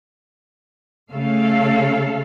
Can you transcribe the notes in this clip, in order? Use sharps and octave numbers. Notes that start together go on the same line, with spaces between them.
C#3 A3 A4 F5